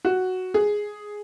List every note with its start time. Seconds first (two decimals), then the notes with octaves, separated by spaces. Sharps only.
0.05 F#4
0.54 G#4